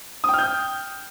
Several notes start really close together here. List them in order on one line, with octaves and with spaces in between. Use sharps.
D#6 G5 F6 G6